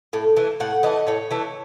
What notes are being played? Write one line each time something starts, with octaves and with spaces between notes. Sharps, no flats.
A2
E3 A3
A2 F#5
E3 A3 D#5
A2 C#5
E3 A3